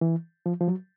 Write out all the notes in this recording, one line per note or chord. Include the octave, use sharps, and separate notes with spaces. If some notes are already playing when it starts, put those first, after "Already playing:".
E3
F3
F3
F#3